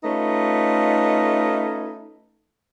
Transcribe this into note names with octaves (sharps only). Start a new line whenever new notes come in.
A3 C#4 D#4 F4 B4